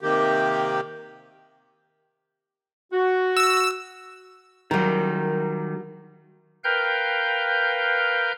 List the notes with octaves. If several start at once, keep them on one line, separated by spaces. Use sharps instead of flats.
C3 D#3 A#3 G4
F#4
E6
D#3 F#3 G3 A#4
A#4 B4 F5 G5 F6 G6